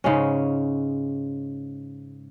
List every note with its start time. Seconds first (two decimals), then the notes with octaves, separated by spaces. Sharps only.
0.04 G#2 C#3 G#3 C#4